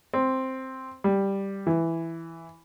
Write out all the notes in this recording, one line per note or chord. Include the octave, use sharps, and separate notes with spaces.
C4
G3
E3